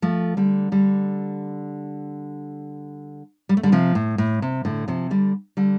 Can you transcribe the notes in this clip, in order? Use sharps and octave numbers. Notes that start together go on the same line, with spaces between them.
F3 A3
D3 G3
D3 G3
G3
A3
D3 G3
C3 F3
A2
A2
C3
A2 D3
C3 F3
D3 G3
D3 G3